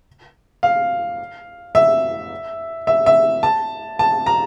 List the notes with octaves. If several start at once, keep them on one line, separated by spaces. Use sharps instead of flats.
F5
E5
E5
E5
A5
A5
A#5